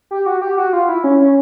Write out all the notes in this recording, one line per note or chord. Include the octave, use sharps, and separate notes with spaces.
G4
F#4
G4
F#4
F4
E4
C#4
C#4